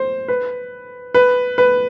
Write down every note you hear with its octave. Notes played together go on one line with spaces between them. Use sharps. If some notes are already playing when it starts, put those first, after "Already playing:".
Already playing: C5
B4
B4
B4